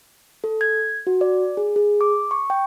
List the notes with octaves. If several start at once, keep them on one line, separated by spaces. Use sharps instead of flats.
A4
G#6
F#4
D5
G#4
G#4
D6
C#6
G5